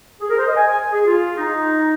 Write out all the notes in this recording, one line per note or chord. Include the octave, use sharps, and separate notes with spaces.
G#4
A#4
C5
D#5
G#5
G#5
G#4
F4
D#4